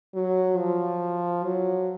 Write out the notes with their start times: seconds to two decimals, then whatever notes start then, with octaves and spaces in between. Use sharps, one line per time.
0.15 F#3
0.58 F3
1.44 F#3